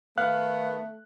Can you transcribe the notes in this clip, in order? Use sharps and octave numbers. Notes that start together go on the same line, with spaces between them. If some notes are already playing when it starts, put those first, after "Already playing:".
D#3 A3 B3 F5 F#6